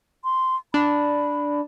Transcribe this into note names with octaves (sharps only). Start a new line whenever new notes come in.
C6
D4 B5